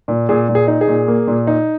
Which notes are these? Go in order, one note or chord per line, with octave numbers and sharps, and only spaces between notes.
A#2
A#2 G#4
A#2
G#4
D#4
G#4
A#2
A#3
A#2
D#4